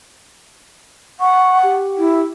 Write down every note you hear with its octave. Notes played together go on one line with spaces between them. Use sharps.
F#5 C#6
G4
E4